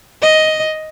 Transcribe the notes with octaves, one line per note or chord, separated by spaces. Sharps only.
D#5